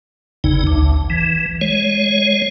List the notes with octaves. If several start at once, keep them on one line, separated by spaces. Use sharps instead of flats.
G1 E2 C#3 D#4
A1 D2
E3
G#3 C#5